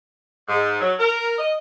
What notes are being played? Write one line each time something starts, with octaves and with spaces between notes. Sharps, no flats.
G#2
F#3
A#4
D#5